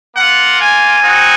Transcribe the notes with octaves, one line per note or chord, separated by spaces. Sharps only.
A#3 F4 F#5
G#5
C4 D#4 F#4